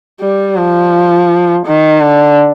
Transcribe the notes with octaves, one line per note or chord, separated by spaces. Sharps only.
G3
F3
D#3
D3